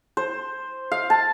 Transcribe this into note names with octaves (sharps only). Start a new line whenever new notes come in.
C5
F5
A5